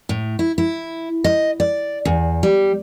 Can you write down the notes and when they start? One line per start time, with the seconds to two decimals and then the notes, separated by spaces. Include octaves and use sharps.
0.09 A2
0.39 E4
0.58 E4
1.24 D#5
1.60 D5
2.05 E2
2.43 G3